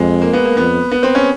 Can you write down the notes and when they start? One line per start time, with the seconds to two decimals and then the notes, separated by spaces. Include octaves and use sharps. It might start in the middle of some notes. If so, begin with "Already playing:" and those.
Already playing: F2 G#3
0.21 A#3
0.33 B3
0.45 A#3
0.57 F2 B3
0.91 B3
1.03 C4
1.15 C#4